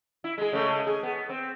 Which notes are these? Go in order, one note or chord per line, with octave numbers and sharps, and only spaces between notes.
E4
G#3 G#4
C#3 G#3 A3
G#4
B3
C4